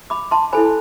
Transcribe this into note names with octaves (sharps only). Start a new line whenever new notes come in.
B5 D6
A5 C6
E4 A4 C5 G#5 B5